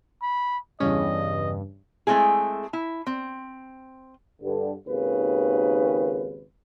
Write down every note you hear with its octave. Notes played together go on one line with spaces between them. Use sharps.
B5
E2 G2 C#3 C#4 D#5
G#3 A3 C4 E4 G#4
E4
C4
G2 D3
G#1 D#2 C#3 B4